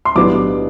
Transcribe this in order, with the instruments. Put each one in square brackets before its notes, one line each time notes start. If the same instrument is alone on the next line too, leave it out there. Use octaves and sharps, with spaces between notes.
[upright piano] C6
B1 A2 G3 B3 D4 D6